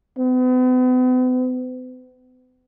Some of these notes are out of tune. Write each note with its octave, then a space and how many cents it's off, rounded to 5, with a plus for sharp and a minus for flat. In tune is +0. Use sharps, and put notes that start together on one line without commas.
B3 +45